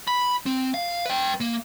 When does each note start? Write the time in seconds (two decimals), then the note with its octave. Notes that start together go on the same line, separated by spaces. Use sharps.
0.08 B5
0.46 C4
0.74 F5
1.05 B4 G5
1.40 A#3